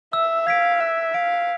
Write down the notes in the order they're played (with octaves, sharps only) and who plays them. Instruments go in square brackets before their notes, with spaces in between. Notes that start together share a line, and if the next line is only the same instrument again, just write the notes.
[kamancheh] E5 [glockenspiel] E6
[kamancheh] F5 [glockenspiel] G#6 B6 D7
[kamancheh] E5 [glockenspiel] F#6
[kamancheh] F5 [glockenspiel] B6 D7